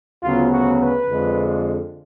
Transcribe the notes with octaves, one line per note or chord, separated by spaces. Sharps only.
D2 C#3 F#3 B3 F4
F#4
B4
F2 D3 G#3